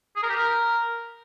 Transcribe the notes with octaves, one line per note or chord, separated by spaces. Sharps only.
G#4
A#4
G4
A#4